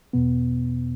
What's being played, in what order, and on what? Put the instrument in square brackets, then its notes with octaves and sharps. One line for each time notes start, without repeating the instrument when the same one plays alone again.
[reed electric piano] E2 B2 B3